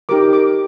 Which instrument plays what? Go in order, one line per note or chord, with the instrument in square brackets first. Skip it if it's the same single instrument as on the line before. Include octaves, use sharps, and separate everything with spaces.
[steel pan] D#4 G4 A#4 D6
D6